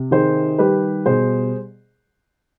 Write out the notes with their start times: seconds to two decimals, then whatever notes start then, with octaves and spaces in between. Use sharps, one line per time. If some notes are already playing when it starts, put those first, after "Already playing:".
Already playing: C3
0.11 D#3 G#4 C5
0.59 G3 G4 B4
1.05 B2 G#4 C5